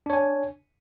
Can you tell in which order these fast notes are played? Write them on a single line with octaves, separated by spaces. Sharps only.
D4 C#5 G#5